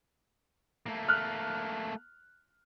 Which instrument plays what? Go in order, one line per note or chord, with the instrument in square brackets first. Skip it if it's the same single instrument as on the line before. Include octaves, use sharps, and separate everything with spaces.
[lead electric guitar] A3 A#3
[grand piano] F6 F#6